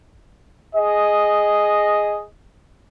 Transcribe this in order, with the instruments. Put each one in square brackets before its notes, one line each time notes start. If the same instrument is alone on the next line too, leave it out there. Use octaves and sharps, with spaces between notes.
[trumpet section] G#4 D#5